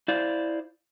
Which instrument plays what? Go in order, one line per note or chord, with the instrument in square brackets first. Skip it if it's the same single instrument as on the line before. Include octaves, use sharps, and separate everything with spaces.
[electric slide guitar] E4 C5 D5 F5